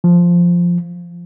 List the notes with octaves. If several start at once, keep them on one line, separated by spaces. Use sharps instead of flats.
F3